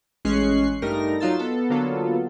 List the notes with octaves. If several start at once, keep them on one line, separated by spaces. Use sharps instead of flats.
A1 G#3 C#4 C#6 F#6 C7
G2 G3 A3 D#4 A#4 A#6
F#3 D#4 F4 C6 E6 A6
B3 A4
D3 F#3 A#3 B3 F4 A4